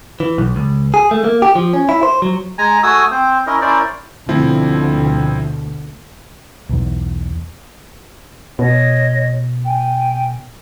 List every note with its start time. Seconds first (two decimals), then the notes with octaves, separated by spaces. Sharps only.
0.20 E3
0.38 B1
0.56 C#2
0.94 G#4
1.11 A3
1.24 A#3
1.42 G4
1.55 F3
1.73 C#4
1.89 E4
2.03 C5
2.22 F#3
2.58 G#3 G#5 A#5
2.83 A3 F#4 G#5 D#6 E6
3.11 C4 C5
3.47 C#4 E4 A#4 D#5
3.61 C#4 E4 A#4 C5 D5
4.29 D2 B2 F3 C4 E4
6.69 B1 E2
8.59 B2 C#5 D#5
9.65 G5 G#5